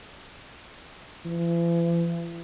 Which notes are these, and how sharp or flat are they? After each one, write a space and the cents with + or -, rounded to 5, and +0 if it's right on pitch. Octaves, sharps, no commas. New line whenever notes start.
E3 +45